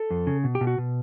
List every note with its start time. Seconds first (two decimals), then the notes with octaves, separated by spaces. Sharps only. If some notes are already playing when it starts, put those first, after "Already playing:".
Already playing: A4
0.10 F2
0.27 C#3
0.44 B2
0.55 G4
0.61 B2
0.67 F#4
0.78 B2